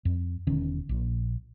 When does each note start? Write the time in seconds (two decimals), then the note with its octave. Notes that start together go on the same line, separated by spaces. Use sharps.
0.05 F2
0.47 E1 D3 D#3 C#4
0.89 A#1 A#2